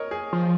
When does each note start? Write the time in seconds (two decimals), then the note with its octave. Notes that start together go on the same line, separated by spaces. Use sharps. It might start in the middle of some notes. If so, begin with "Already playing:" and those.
Already playing: A#4 C#5 D#5
0.11 G#4
0.33 F3